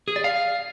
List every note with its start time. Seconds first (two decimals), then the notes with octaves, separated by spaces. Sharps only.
0.08 G#4
0.16 D5
0.24 F5